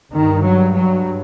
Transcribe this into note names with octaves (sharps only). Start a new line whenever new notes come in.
G2 D#3
F#3
F#3